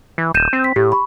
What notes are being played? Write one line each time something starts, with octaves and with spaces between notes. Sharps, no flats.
E3
D#1 G6 D#7 E7
C4
B6
A2 G4
B5 C#6